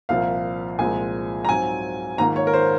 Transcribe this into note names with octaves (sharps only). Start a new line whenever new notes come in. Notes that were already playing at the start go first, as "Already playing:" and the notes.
C2 A#2 F3 F5
C2 A#2 F3 G#3 G#5
A#5
G#2 F#3 C4 F4 G#5
G#2 D#3 A#3 F4 A#5
C#5
A#4
C5